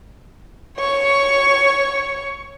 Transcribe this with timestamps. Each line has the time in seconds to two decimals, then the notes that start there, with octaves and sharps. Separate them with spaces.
0.78 C#5 C#6